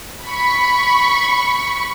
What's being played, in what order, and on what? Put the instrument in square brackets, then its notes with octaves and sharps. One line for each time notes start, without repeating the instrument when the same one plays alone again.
[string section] B5 C#6